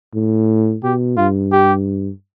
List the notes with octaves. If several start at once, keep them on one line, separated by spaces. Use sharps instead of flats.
A2
B2 G4
G2 F4
G4